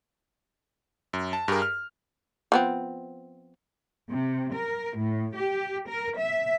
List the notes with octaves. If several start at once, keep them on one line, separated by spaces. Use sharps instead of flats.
F#2
A5
G2 G4 G#4 A#4
F6
F3 B3 C4
C3
A#4
A2
G4
A#4
E5